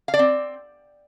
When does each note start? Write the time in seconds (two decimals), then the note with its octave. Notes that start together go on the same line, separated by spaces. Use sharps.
0.08 F5
0.14 D5
0.19 C4